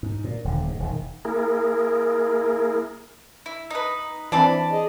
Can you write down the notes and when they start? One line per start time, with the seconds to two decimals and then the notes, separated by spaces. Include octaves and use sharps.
0.03 G#2
0.24 A#2
0.45 D#1 D3
0.68 G#2
0.80 E1 D#3
1.25 A#3 E4 G#4 A#4
3.46 E4
3.70 D#4 B4
4.32 E3 C4 D4 D5 A5 B5
4.71 G#4 D#5